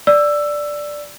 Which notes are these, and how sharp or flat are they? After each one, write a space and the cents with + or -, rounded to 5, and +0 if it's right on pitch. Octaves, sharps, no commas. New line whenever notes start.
D5 +0 E6 +10